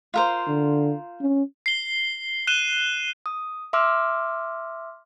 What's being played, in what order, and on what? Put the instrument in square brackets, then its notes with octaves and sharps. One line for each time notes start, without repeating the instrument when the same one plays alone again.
[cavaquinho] F4 A#4 C5
[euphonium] D3
C#4
[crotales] C7 G7
F#6 D#7 E7 G7
[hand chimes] D#6
E5 C6 D6 E6 F6